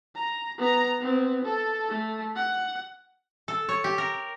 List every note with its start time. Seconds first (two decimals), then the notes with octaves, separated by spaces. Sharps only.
0.15 A#5
0.58 B3 A#5
0.99 B3 C4
1.45 A4
1.89 A3
2.36 F#5
3.48 A4
3.69 C#5
3.84 G4
3.98 A#4